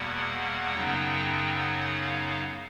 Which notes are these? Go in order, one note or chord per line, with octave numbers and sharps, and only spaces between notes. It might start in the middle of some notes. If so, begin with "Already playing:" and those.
Already playing: E2 B2 G3 A#3 F#5
F#2 C#3 F#3 B3 D#4 G5
F#5
F5